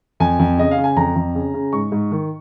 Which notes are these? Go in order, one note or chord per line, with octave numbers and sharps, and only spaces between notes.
F2 G#5
F2
C#3 D#5
F5
C#3
G#5
F2 A#5
F2
C#3
C#3
G#2 C#6
G#2
D#3